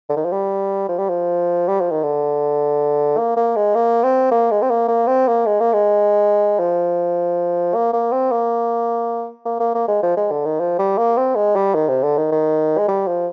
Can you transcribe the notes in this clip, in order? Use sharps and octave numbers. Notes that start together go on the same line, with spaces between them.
D3
D#3
F3
G3
F3
G3
F3
G3
F3
D#3
D3
A#3
A#3
G#3
A#3
C4
A#3
G#3
C4
A#3
A#3
C4
A#3
G#3
A#3
G#3
F3
A#3
A#3
C4
A#3
A#3
A#3
A#3
G#3
F3
G#3
D3
D#3
F3
G3
A#3
C4
G#3
G3
D#3
C3
D3
D#3
D#3
G#3
G3
F3